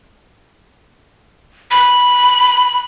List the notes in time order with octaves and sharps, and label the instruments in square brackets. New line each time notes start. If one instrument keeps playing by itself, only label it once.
[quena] B5